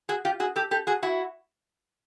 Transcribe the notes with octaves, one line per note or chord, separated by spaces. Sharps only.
F#4 G#4
F4 G4
F#4 G#4
G4 A4
G4 A4
F#4 G#4
E4 F#4